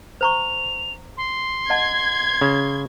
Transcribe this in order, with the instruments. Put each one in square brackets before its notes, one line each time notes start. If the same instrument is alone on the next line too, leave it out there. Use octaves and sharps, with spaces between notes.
[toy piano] C5 A#5 C#6 [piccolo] F7
[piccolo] C6
[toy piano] D#5 F#5 A5 [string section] G#6
[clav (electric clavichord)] C#3